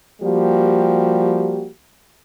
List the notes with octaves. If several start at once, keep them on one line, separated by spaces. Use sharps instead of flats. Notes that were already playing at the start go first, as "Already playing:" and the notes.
F3 G3 A#3 F#4 G4